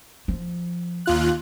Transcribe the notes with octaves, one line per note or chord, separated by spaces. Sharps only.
F3
D#2 F4 F#6